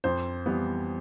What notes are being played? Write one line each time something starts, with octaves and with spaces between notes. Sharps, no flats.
F2 C5
E3 G3 B3